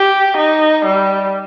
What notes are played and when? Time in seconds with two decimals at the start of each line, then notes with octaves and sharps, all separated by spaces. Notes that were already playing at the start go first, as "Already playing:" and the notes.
Already playing: G4
0.37 D#4
0.85 G3